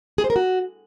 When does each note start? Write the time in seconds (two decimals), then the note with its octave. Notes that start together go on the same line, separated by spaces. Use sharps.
0.18 G#4
0.24 C5
0.30 A#4
0.36 F#4